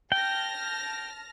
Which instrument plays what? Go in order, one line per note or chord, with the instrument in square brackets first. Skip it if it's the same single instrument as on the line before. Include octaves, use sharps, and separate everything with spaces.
[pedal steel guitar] G5 [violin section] A5 F6 A#6